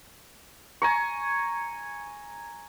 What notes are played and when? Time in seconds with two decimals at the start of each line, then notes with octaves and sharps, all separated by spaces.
0.82 G#5 A#5 C#6